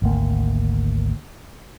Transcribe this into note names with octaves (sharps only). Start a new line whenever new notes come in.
G#1 D2 A#3